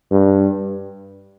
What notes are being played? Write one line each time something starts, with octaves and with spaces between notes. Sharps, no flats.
G2